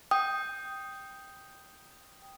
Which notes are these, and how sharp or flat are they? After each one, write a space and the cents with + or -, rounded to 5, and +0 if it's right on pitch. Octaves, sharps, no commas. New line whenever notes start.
G5 +0 D#6 +0